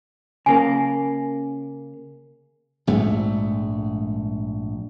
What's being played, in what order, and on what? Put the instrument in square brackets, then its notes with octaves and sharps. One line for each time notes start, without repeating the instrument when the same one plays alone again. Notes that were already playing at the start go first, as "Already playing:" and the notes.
[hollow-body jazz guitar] C#3 A#3 [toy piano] G#5
[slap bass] A#1 G#2 G#3 A3